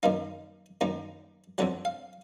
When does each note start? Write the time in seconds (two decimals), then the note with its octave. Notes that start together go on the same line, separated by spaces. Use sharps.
0.03 F#2 D#3 A#3 D#4 F5
0.81 F#2 D#3 A#3 D#4
1.58 F2 D3 F#3 F#5
1.85 F5